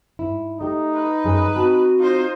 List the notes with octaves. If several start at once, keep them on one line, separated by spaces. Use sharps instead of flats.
G#2 E4
A3 D#4 G4
B4
F#2 G#4
C4 F#4 A5
D#4 F4 C5